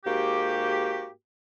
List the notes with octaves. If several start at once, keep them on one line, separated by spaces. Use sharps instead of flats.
G#2 A#3 F#4 G4